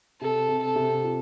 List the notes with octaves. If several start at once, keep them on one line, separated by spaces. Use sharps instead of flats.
C3 A4
C3
A4
C3
F4